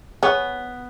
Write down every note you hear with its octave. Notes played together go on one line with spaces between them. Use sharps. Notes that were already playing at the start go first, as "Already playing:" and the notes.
B3 G#4 C#5